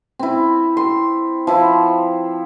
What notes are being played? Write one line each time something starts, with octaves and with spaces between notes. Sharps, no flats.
C4 E4
C6
F3 E4